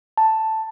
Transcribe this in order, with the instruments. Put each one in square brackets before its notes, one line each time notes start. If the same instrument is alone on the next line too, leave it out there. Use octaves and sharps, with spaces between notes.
[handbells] A5